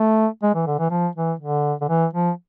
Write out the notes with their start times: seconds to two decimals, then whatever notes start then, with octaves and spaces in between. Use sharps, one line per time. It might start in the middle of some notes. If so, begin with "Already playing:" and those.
Already playing: A3
0.43 G#3
0.54 E3
0.67 D3
0.79 E3
0.90 F3
1.16 E3
1.39 D3
1.81 D3
1.89 E3
2.14 F3